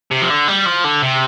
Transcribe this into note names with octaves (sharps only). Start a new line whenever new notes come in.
C3
F3
D3
G3
F3
D3
C3